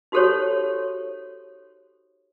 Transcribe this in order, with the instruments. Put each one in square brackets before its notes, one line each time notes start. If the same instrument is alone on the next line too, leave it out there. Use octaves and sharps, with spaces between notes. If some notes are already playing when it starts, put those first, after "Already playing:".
[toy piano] D#4 F#4 G4 A4 C5 C#5